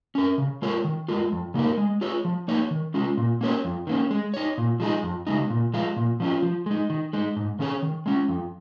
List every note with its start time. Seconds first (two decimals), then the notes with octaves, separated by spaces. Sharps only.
0.15 C#4 A#4
0.38 C#3
0.62 G#3 F4 A#4 C#5
0.84 D#3
1.08 G#3 F4 A#4
1.32 F2
1.54 C#3 A#3 D#4 A#4
1.77 G#3
2.01 F4 G#4 C#5
2.25 F3
2.48 A#3 D#4 C#5
2.71 D#3
2.94 G#3 C#4 F4
3.17 A#2
3.41 A#3 C#4 A#4 C#5
3.65 F2
3.87 D#3 A#3 C#4
4.11 G#3
4.34 D#4 C#5
4.58 A#2
4.80 F3 G#3 D#4 G#4
5.03 F2
5.27 C#3 G#3 D#4
5.50 A#2
5.74 F3 G#3 F4
5.96 A#2
6.20 F3 C#4 F4
6.42 F3
6.66 G#3 D#4
6.90 D#3
7.13 G#3 D#4
7.37 G#2
7.59 D#3 C#4 G#4 C#5
7.83 D#3
8.06 G#3 C#4
8.29 F2